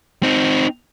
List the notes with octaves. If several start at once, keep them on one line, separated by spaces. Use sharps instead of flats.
C4 D#4